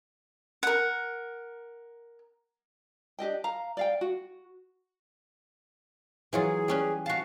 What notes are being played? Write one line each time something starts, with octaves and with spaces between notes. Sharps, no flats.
A#4 F#5
D4 G4 D#5 G5
F5 A#5
D5 F5 G5
F#4
E3 F#3 F4 G#4
G3 C#4 B4
F#4 F5 A5